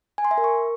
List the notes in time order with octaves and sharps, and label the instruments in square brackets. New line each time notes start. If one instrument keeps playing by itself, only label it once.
[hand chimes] G#5
C6
E5
A#4
C#6